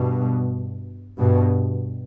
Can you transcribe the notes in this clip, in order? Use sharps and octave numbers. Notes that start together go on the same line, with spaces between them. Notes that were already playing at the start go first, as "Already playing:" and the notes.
Already playing: G2 B2
G2 B2